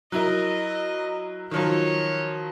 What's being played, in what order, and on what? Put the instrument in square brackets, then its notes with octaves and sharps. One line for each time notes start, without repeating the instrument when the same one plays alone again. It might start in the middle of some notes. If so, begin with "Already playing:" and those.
[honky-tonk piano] F#3 E4 A#4 [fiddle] D#5
[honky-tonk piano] D#3 F3 F#3 [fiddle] C#5